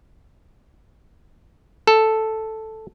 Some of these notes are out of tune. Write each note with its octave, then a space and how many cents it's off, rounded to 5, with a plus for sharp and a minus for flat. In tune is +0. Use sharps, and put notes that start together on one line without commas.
A4 +0